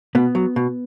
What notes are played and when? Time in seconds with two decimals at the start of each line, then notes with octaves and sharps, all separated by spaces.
0.15 B2 B3
0.35 F#3
0.56 B2